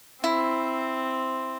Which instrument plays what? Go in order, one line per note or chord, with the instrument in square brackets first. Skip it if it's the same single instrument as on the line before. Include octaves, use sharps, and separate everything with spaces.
[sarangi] C4 [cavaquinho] E4